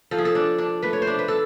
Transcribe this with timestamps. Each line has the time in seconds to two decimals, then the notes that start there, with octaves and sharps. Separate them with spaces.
0.11 F3 A4
0.18 G#4
0.25 A4
0.35 D4
0.58 D4
0.83 A3 B4
0.93 C#5
1.02 C5
1.07 D4
1.19 B4
1.28 A4